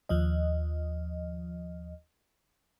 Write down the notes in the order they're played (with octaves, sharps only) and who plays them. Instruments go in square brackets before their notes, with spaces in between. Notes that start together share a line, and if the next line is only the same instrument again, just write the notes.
[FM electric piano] D#2 F3 D#5